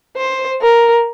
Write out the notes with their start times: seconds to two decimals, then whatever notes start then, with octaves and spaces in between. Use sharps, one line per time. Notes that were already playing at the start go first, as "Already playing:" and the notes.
0.17 C5
0.61 A#4